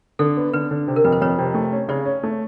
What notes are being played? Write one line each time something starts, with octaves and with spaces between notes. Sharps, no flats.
D3 A4
B3
D3 B4
D3
C3
A#4
F2 B4
C5
F2 B4 C#5
C3
A3
C#4
C#3 C5 D5
C#4
A3